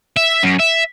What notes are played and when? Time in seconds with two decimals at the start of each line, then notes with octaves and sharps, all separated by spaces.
0.17 E5
0.43 F#2
0.59 E5